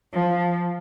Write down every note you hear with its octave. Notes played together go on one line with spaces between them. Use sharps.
F3